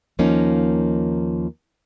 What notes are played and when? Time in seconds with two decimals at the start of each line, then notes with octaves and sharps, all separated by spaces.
0.19 D#2 F3 A#3 C#4 D#4